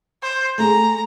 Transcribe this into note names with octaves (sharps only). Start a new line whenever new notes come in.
C5
A3 G#4 A#5